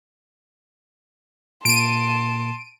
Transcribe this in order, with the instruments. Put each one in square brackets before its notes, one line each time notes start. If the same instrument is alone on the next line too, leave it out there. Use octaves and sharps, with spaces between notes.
[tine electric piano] A#2 A#3 [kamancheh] A5 C6 [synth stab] D7 D#7